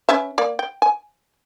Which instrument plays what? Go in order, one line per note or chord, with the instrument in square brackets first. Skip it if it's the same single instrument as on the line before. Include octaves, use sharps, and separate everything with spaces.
[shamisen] C#4 B4 E5
A#3 D5
G5
G#5